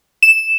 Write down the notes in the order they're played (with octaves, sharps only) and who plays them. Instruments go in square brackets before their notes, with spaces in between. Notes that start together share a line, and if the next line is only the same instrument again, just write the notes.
[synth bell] E7